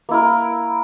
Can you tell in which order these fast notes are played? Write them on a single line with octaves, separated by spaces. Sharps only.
A#3 E4 A#4